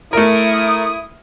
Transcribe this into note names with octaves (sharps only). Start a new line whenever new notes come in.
A3 E4 A#4 D#6